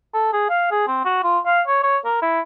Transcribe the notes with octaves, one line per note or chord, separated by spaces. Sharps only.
A4
G#4
F5
G#4
C4
F#4
F4
F5
C#5
C#5
A#4
E4